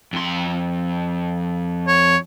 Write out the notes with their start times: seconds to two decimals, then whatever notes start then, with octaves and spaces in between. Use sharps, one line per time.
0.13 F2 C6
1.87 C#5